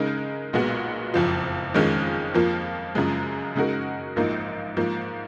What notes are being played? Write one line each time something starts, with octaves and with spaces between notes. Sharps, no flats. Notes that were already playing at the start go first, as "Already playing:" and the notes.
Already playing: C#3 G#3 D#4 A#4
B1 A#2 G#3 B3 F#4
F#1 F2 F3
F2 D#3 G#3 C#4 F4
F2 F3 A#3 F4
F#2 C#3 F3 G#3
C#3 G#3 D#4 F#4 A#4
A#1 G#2 F3 A#3 D#4
G#2 F3 A#3